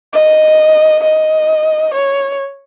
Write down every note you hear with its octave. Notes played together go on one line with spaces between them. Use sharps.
D#5
D#5
C#5